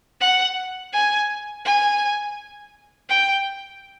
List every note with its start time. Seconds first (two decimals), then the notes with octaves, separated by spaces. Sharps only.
0.21 F#5
0.93 G#5
1.65 G#5
3.09 G5